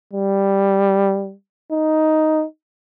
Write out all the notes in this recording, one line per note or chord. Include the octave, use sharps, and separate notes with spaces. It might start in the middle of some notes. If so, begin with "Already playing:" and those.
G3
D#4